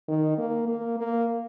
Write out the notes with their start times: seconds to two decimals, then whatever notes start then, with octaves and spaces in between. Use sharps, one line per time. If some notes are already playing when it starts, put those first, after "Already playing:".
0.08 D#3
0.38 A#3
0.68 A#3
0.98 A#3